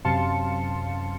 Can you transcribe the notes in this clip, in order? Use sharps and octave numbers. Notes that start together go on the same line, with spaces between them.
F#2 C3 F5 A5 C6 C#7